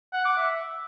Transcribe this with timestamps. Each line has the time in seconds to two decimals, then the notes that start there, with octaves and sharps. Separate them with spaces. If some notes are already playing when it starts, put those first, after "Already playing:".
0.13 F#5
0.25 D6
0.37 E5